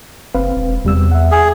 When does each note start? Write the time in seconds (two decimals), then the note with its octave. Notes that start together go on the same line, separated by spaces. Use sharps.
0.35 F#1 C4 B4 F5
0.56 E1
0.85 E2 C3 G3 E6
1.11 E5 F#5
1.32 G#4